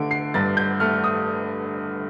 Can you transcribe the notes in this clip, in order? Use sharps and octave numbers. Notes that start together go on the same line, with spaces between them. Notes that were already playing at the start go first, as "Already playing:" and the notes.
Already playing: D3 A3 D7
C7
G2 A6
G6
A3 F6
D#6